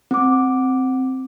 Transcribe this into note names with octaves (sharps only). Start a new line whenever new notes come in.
C4 D6